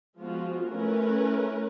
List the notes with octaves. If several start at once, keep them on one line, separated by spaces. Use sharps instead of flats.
F3 G#3 B3 F4 F#4
A3 C#4 E4 A#4 B4